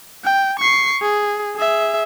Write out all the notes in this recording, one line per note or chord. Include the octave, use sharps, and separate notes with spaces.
G5
C#6 C7
G#4
G#4 E5